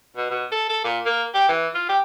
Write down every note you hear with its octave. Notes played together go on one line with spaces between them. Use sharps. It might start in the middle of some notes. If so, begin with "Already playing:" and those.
B2
B2
A4
A4
A#2
A#3
G4
E3
F4
G4